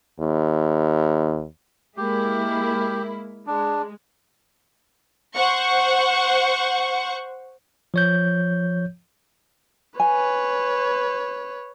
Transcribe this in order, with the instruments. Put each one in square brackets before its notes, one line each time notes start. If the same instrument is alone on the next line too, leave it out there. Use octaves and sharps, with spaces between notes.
[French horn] D#2
[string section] G#3 A#3 E4 [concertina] G4
[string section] G#3 [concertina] D4
[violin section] C5 F#5 C#6
[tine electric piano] F3 C#5 G6
[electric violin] B4 C#5 [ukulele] G#5